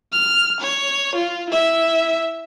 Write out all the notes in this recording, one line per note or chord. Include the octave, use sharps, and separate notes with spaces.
F6
C#5
F4
E4 E5